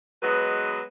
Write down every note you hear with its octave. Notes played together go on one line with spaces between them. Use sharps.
F#3 G#3 B3 B4 D#5